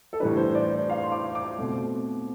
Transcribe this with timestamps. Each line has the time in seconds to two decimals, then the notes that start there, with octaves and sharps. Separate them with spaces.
0.13 A4
0.20 A2 E3 G3 D4 B4
0.37 C5
0.55 D5
0.72 D5
0.90 F5
1.03 C6
1.12 D6
1.35 D6
1.58 B2 A3 C4